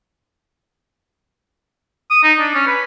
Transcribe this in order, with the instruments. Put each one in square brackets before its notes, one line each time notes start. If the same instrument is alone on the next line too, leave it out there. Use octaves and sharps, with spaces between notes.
[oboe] D#6
D#4
D4
C#4
B4